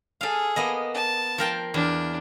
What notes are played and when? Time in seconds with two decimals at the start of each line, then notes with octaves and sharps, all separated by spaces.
0.21 G#4 A4 F5
0.56 A#3 B3 D#5
0.94 A5
1.38 F3 A#4 G5
1.74 E2 D4